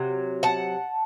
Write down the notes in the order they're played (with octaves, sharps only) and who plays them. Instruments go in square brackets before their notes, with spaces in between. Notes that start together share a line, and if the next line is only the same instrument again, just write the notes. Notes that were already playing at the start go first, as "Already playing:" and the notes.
Already playing: [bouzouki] C3 F#3
F#5 A5